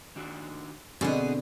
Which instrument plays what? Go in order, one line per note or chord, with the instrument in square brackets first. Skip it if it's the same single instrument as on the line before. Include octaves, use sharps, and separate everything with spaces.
[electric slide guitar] D#3 D4 F#4
[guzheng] B2 D3 [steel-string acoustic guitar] B3 G#4 [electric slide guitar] C4